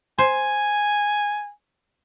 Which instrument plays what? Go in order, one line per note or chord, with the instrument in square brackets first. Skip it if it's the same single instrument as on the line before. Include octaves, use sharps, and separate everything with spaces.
[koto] C5 [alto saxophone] G#5